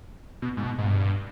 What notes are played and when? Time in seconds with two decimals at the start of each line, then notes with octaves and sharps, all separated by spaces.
0.42 B2
0.57 G#2
0.63 B2
0.78 G#2
0.86 G2